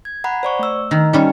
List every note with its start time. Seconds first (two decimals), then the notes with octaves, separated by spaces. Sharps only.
0.05 G#6
0.24 F#5 A#5 B5
0.43 C5 D5 C#6
0.59 A3 E6
0.91 D#3
1.13 G3 C#4 D#4